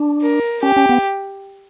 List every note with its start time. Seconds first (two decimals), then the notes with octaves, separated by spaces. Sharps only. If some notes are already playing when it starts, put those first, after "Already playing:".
Already playing: D4
0.22 A#4
0.63 C#4 G4
0.76 C#4
0.89 B3